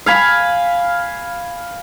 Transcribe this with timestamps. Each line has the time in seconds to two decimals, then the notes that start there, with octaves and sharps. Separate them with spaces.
0.06 F5 G#5 B5